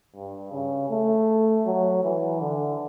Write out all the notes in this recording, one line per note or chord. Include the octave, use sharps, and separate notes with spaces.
G2
C#3
A3
F#3
E3
D3